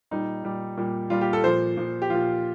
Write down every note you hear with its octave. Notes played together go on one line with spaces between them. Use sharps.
A#2 G3 D#4
A#2 G3
A#2 G3
A#2 G3 F4
G4
A4
A#2 F3 C5
A#2 F3
G4
A#2 F3 F4